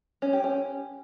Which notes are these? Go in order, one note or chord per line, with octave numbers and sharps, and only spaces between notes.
C#4
G4
C#4